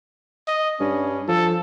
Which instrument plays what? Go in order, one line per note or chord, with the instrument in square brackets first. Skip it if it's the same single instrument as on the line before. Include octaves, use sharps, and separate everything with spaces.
[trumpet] D#5
[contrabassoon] G2 [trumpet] C#4
[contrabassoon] F3 [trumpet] A4